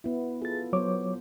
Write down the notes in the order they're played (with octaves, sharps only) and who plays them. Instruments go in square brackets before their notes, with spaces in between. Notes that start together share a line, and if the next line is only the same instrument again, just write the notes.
[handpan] B3 E4
[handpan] F4 A4 [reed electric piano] G#4 A6
[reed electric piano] F#3 C#5 D6 [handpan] B3 C5